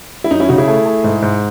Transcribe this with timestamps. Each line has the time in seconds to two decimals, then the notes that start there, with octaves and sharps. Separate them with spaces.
0.24 E4
0.31 F#2 D#4
0.40 C#4 E4
0.49 C#3 D#4 F#4
0.58 E4 G#4
0.68 A3
0.86 A3
1.04 G#2
1.22 G#2